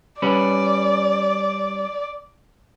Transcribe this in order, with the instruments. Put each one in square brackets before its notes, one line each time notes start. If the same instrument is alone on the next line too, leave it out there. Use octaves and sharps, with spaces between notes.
[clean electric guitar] G3 C#4 B4 [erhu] D5